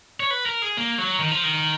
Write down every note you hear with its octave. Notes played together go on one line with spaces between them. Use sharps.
C#5
B4
A#4
G#4
A#3
F#3
D#3
F3
D#3